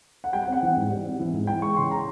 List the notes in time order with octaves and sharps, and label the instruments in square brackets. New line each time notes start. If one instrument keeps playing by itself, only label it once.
[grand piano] F#5
G3 G5
F#5
C4
F#5
E3
G#2
G3
C4
E3
G#2
E3 G5
G#3 C#6
C#3 C6
A#5